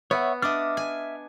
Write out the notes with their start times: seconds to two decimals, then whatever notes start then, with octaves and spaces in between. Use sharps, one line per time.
0.11 B3 C#5 E5 F#5
0.42 D4 D#5 E5 D6 F6
0.77 G#5